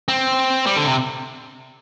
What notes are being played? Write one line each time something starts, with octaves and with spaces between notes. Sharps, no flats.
C4
G3
D3
C3